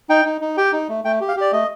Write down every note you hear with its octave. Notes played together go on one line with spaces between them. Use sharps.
D#4 G5
D#4
D#4
G4 G5
D#4
A3
A3 G5
G4
F5
G4 D5
A3 D#5